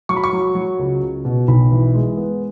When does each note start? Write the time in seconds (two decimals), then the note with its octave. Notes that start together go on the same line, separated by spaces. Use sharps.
0.09 F#3 C#6
0.16 B5
0.24 C#6
0.32 F#3
0.55 F#3
0.79 C#2
1.02 C#2
1.25 B2
1.48 B1 B5
1.71 E3
1.95 G#3
2.17 B3